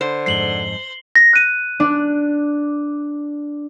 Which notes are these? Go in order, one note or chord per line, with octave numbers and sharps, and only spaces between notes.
D3 C5
F2 G#2 C7 F#7 G7
A#6
F#6 D#7
D4